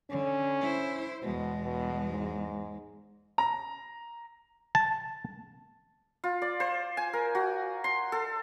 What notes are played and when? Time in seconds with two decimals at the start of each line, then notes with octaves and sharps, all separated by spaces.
0.10 D3 C#4
0.61 E4 C5
1.22 E2 B2 G#3
1.63 B2
2.10 G#2
3.38 A#5
4.75 A5
6.24 F4
6.42 D5
6.60 C5
6.97 G#5
7.13 A#4
7.35 F#4
7.84 C6
8.12 A4